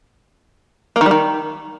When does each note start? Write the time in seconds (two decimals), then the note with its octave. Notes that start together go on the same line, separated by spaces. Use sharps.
0.96 A#3
1.01 D#3
1.06 G3
1.11 D#3